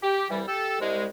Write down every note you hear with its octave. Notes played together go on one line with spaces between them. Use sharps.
G4
C2 E3 G3
G4 A4
C2 G#3